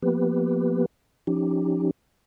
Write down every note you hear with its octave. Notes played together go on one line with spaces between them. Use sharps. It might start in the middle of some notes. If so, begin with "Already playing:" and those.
F3 A#3 B3 G4 B4
F3 C#4 D#4 G4